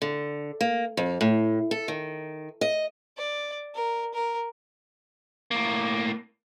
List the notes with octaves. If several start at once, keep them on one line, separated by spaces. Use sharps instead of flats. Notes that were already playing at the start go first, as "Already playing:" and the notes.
D3
A#3
F2
A2
A4
D#3
D#5
D5
A#4
A#4
A2 A#3